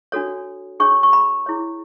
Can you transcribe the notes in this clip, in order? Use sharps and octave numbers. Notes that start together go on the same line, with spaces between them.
D4 F#4 A4 C#5
D4 G#4 C#5 C#6
C#6
B5
E4 G#4 C#5